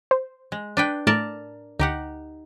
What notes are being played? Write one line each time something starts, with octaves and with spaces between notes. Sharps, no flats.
C5
G#3
D4 B4 G5
A2 A3 A#4 D5 A5
D2 D#4 G4 F#5